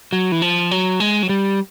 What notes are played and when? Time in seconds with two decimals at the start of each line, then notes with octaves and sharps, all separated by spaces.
0.13 F#3
0.32 E3
0.42 F3
0.71 F#3
1.00 G#3
1.23 F#3
1.29 G3